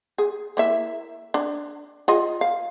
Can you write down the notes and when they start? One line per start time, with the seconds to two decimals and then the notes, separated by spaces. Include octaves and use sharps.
0.18 G#4
0.57 A#3 E4 E5
1.34 D4
2.08 F4 G#4 D#5
2.41 F5